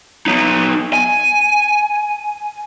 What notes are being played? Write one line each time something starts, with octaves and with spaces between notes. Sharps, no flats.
B3 D#4
G#5